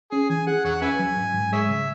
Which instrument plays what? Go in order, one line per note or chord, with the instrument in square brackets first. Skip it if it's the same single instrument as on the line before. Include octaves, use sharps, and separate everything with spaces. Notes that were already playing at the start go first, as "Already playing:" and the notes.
[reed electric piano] C#4 [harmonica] G#4
[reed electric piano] E3 [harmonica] G#5
[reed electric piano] G#4 [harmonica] F#5
[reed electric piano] E2 [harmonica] C#5 F#5
[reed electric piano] C#4 [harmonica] B4 E5 G#5
[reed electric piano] F#3
G#2
G#2
[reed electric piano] G#3 [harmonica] G#4 C#5 E5
[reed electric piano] C#3